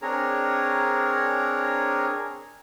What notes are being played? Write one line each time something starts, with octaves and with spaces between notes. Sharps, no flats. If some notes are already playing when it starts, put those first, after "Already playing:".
C4 D4 G#4 A#4 C#5 A#5